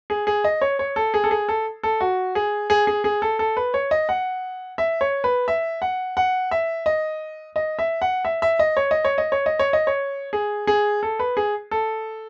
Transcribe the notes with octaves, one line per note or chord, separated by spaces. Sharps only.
G#4
G#4
D#5
C#5
C#5
A4
G#4
A4
G#4
A4
A4
F#4
G#4
G#4
G#4
G#4
A4
A4
B4
C#5
D#5
F#5
E5
C#5
B4
E5
F#5
F#5
E5
D#5
D#5
E5
F#5
E5
E5
D#5
C#5
D#5
C#5
D#5
C#5
D#5
C#5
D#5
C#5
G#4
G#4
A4
B4
G#4
A4